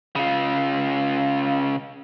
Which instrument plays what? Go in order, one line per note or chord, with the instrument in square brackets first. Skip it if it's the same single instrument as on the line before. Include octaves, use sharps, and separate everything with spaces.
[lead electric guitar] C#3 F4